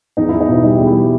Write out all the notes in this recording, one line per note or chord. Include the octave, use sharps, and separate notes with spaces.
E2 D#4
E2 E4
D#4
B2 E4
G3 D#4
E2 G4
E4
G3